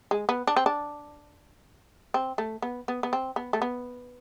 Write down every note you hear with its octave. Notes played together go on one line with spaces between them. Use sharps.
G#3
B3
D4
C4
D4
C4
A3
B3
B3
B3
C4
B3
A3
B3